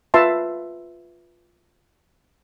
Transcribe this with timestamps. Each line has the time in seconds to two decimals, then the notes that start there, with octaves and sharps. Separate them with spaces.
0.14 F4 B4 E5 A5 C6